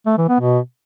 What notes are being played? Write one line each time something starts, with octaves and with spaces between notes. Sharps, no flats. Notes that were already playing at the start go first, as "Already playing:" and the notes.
A3
E3
B3
B2